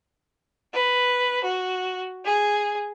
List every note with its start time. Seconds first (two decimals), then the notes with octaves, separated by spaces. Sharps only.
0.73 B4
1.44 F#4
2.25 G#4